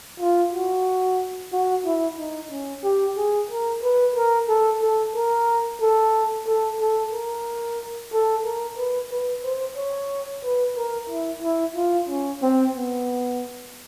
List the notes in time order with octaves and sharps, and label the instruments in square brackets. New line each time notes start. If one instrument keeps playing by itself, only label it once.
[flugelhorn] F4
F#4
F#4
E4
D#4
C#4
G4
G#4
A#4
B4
A#4
A4
A4
A#4
A4
A4
A4
A#4
A4
A#4
B4
B4
C5
C#5
B4
A#4
E4
E4
F4
C#4
C4
B3